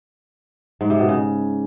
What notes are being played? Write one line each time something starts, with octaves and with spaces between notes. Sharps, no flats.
G#2
C3
B2
C#3